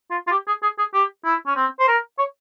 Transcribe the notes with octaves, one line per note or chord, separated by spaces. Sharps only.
F4
F4
G4
G#4
G#4
G#4
G4
E4
C#4
C4
C5
A#4
C#5